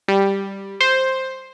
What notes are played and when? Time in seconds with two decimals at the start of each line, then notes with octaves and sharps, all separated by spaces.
0.08 G3
0.81 C5